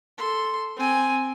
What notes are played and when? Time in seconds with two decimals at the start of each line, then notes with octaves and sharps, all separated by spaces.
0.18 A4 C6
0.76 C4 G#5